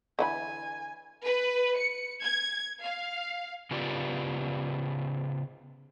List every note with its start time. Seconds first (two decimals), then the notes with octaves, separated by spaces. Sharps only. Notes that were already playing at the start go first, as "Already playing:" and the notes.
0.19 D3 E3 G#5 B5
1.25 B4
1.77 C#7
2.22 G#6
2.82 F5
3.71 C#3 B3 F4 G4 D5